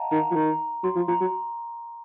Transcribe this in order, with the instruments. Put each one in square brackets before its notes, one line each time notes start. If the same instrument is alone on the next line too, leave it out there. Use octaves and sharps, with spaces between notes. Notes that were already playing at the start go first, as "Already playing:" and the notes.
Already playing: [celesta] D#5 F5 F#5 A5 A#5
[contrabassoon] D#3 [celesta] A#5
[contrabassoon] F3
[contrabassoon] D#3 [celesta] A#5
[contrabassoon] F#3 [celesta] C6
[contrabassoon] F3
[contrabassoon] F3 [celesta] A#5
[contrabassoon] F#3